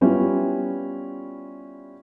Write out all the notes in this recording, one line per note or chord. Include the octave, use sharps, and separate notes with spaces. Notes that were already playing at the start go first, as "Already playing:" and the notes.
G3 B3 C#4 E4 F4 G4